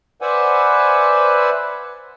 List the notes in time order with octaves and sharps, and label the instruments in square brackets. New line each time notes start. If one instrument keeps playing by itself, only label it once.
[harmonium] B4 C5 D5 E5 F#5 G#5